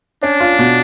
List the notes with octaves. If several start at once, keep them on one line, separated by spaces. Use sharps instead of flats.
C#4 D4
F4
B2